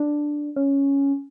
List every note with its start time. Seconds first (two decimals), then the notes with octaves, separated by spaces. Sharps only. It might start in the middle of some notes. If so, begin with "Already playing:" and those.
Already playing: D4
0.56 C#4